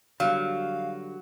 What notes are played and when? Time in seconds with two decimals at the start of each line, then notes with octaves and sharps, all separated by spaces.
0.20 D3 F#3 G3 F5